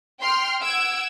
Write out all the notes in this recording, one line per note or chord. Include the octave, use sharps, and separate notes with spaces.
G5 C6 F6
F#5 E6 G#6 D7